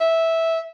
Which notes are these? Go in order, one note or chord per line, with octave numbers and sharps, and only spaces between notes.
E5